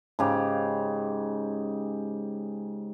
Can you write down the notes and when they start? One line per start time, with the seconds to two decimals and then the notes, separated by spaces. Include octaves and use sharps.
0.19 G#2 C#3 G4